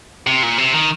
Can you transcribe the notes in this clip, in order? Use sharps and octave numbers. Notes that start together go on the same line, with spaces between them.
C3
A#2
C3
D#3